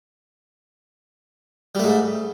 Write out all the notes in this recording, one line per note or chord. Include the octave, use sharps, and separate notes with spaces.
G#2 G3 A3